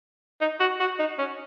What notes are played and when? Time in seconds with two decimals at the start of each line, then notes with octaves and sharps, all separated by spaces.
0.41 D#4
0.60 F#4
0.80 F#4
0.99 D#4
1.19 C#4